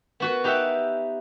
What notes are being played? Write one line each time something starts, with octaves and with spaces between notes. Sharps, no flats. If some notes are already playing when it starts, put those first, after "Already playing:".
B3 F#4 B4
D#4 G4 B4 E5 F#5 G5